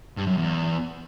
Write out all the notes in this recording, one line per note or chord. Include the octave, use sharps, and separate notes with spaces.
G2
F#2
E2